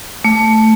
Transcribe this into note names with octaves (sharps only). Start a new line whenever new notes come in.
A3